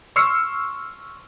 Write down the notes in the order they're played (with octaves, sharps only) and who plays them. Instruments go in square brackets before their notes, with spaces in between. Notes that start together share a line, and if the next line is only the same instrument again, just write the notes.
[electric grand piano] C6 C#6 E6 F6 C7 C#7